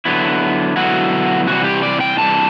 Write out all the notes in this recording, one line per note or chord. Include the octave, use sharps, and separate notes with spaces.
D3 F#3 B3 E4
D3 F#3 B3 E4 F#4
C3 E3 G3 F#4
G4
D5
G5
C3 E3 G3 A5